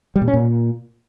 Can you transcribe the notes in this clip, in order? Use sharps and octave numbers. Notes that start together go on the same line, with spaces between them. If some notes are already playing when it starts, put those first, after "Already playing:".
G3
A#2
C#4
A#2